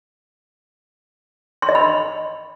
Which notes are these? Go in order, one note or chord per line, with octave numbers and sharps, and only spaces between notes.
C6
D#5
B5